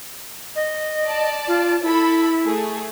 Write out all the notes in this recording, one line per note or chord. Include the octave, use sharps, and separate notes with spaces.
D#5
D5 A5
F4
E4 A4 B5
A3 G#4